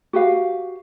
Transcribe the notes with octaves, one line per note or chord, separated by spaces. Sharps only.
F#4 G4 B4 F5